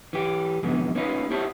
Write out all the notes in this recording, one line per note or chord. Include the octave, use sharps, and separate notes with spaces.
E3 G4
F2 G#2 B2 D3 E3
A#3 C#4 D#4 F4 B4
E4 G4 C5 C#5 E5 A5